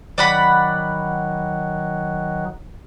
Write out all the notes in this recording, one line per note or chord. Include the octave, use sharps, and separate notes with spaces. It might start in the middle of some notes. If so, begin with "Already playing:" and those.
D#3 F#3 D5 F#5 B5